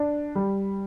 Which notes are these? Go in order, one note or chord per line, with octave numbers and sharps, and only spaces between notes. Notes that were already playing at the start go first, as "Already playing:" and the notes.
Already playing: D4
G3